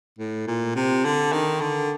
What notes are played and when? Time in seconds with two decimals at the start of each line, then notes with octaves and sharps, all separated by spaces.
0.19 A2
0.47 A#2
0.75 C3
1.05 D3
1.33 D#3
1.61 D3